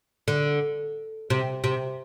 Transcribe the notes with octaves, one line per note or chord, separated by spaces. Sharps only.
D3
C3
C3